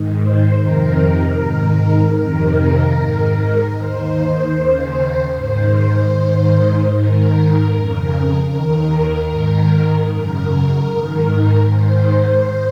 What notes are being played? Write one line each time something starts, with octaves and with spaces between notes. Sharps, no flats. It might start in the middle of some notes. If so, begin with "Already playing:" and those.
Already playing: G#2 D#3
C5
F2 C3 D#3 A#4
G#2 D#3
F2 C3 D#3 A#4
G#2 D#3
D#2 D#3 C5
D#2 C#3
G#2 D#3 C5
G#2 D#3
G#2 D#3 A#4
F2 C#3
D#2 D#3 A#4
G#2 D#3
F#2 C#3 A#4
G#2 D#3
G#2 D#3 C5